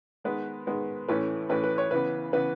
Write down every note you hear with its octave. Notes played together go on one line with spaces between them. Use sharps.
D#3 G#3 B3 B4
D#3 G#3 B3
A2 E3 A3 C#4 B4
A2 E3 A3 C#4 B4
B4
C#5
C#3 E3 B3 B4
C#3 E3 B3 B4